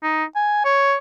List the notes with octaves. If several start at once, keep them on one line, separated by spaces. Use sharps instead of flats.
D#4
G#5
C#5